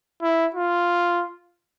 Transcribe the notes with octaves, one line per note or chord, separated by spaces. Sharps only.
E4
F4